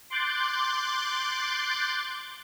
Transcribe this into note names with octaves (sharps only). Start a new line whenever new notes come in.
C6 D6 F#6 G6 A6